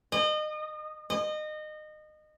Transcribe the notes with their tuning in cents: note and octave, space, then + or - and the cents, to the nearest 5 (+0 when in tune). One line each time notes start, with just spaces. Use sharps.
D#5 -30
D#5 -25